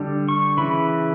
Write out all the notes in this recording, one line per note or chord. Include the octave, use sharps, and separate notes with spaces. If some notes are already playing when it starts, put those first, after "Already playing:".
Already playing: D3 G3 D4
C#6
C#3 E3 B5